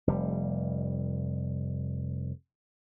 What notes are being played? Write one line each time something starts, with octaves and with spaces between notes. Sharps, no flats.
F1 G3